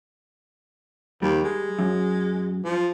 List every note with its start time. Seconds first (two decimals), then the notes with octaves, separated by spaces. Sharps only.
1.22 D#2 G3
1.43 G#3
1.79 F#2
2.65 F3